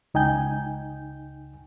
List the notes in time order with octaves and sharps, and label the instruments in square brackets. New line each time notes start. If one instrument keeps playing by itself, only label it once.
[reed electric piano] C#2 D#4 G5 G#5 G6